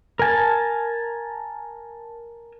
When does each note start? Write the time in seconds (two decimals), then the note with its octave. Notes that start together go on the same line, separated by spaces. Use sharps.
0.19 A#4 G#5 A5